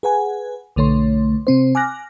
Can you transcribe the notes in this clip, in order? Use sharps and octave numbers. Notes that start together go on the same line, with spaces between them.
G#4 B4 F#5 G#5
B1 D3 A3 C#5 C6
C3 C4 C5
G#5 D6 F6 F#6 A#6